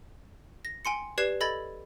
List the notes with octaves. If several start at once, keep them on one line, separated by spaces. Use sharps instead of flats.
A#6
G5 G#5 C6 C#7
G4 B4 D5 G#6 C7 E7
A4 D#5 B5 G#6 A6 F#7